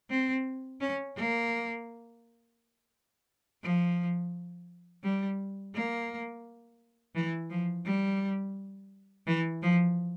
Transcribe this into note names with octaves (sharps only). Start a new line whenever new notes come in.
C4
C#4
A#3
F3
G3
A#3
E3
F3
G3
E3
F3